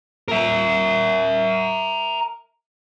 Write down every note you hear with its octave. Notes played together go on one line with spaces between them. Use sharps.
A#4 E5